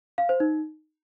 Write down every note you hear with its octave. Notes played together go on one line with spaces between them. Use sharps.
F5
C5
D#4